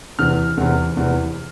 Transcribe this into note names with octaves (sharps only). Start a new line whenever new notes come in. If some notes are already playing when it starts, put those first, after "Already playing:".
E2 C3 E3 F6
E2 C3 E3
E2 C3 E3